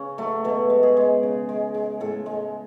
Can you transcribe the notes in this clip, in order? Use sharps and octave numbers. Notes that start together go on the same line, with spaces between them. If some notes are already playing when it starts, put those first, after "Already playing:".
Already playing: C#3 C#4
F#3 A3
B2 A3
G#3
G#4
G#3
C#3
G#3
G#3
A2 A4
G#3